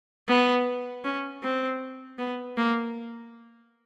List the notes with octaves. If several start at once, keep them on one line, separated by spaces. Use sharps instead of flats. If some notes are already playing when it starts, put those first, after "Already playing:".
B3
C#4
C4
B3
A#3